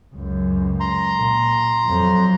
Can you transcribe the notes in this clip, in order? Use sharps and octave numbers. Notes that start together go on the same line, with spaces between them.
C#2 F#2
A#5 C6
A#2
F2 F#3